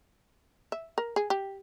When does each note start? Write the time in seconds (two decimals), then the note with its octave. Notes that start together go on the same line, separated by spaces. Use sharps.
0.72 E5
0.98 A#4
1.16 G#4
1.30 G4